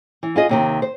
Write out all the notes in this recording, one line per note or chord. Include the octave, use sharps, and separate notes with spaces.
E3
F4 G#4 D#5
D#2 C3 D#3
C5